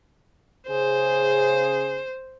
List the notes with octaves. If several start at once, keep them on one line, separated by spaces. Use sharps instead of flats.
C#3 G#4 C5